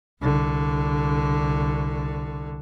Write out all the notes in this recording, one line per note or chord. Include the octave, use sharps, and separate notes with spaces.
C2 D3